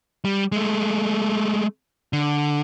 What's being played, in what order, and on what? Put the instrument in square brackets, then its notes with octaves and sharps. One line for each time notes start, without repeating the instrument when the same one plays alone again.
[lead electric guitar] G3
G#3 A3
D3